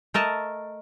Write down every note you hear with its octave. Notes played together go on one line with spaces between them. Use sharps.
A3 A#4 D#5 A5